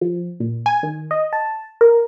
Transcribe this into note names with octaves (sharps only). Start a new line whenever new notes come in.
F3
A#2
G#5
D#3
D#5
A5
A#4